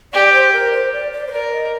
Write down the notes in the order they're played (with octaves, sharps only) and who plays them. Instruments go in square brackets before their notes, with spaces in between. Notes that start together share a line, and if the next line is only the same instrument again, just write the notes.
[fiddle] G4 [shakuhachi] D5
[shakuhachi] C5
A#4
C5
D5
D5
C5
[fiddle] A#4 [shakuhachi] D5
[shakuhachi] D#5